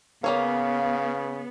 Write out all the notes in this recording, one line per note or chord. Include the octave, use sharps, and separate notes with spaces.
C#3 A#3 B3 C#4 C#5 F5